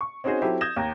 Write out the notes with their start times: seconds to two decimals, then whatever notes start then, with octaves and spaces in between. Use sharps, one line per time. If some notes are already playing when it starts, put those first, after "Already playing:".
0.01 C#6
0.24 C4 C#4 D#4 F#4 G#4 C5
0.42 F#3 C4 E4 G4 A4
0.61 D#6 G6 G#6 A#6 E7
0.76 D#2 A#5